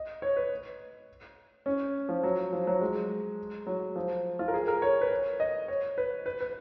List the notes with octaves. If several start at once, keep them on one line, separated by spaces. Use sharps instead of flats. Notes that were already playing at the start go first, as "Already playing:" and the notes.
Already playing: D#5
C#5
B4
C#4
F3
F#3
F3
F#3
G#3
F#3
F3
F4
A#4
G#4
A#4
C#5
B4
C#5
D#5
C#5
B4
B4
B4